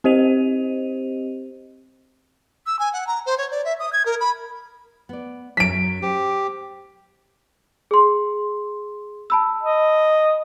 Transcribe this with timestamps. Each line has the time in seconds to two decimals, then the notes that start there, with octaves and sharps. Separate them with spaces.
0.04 C4 G4 C5 D#5 D#7 F7
2.66 E6
2.79 G#5
2.93 F#5
3.07 A#5
3.26 C5
3.38 C#5
3.51 D5
3.65 E5
3.79 D#6
3.93 G#6
4.06 A#4
4.20 B5
5.09 B3 D5
5.57 F#2 F#3 B6 D7
6.02 G4 C5
7.91 G#4 C6
9.30 A5 B5 E6
9.63 D#5